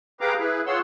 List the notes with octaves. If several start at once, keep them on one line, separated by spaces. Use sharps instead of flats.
G4 G#4 B4 F5 A#5 D6
E4 G#4 B4
F4 G#4 C#5 F#5 C6 E6